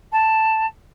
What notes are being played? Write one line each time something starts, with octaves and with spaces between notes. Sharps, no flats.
A5